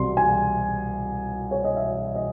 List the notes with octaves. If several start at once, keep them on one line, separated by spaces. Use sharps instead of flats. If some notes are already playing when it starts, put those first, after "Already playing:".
Already playing: C2 C3 F#3 C6
G#5
C#5
D#5
E5
D#5